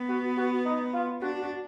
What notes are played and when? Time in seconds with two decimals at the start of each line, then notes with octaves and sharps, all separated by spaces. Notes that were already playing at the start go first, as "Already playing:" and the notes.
Already playing: B3
0.08 F#4
0.37 F#4
0.65 D#4
0.93 F4
1.21 D4 F#4
1.41 F#4